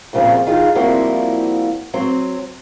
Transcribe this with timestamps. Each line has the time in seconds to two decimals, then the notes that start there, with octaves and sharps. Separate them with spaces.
0.13 F#2 A#2 C#3 F3 G3 C4
0.47 D#3 D#4 F4 G#4
0.75 F3 G3 A#3 C4 E4 F#4
1.94 F#3 C4